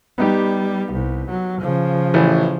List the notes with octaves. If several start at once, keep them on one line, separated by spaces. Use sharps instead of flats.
G3 B3 D#4 G4
C2
F#3
C#3 F3
A1 E3